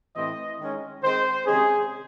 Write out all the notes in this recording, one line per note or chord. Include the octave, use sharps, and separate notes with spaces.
A2 E3 C4 D#5
D#3 G#3 C#4
D#3 G#3 C4 C5
C3 D#3 G#3 C#4 G#4